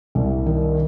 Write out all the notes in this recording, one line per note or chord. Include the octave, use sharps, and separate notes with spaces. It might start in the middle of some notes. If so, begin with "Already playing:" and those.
C2
D#3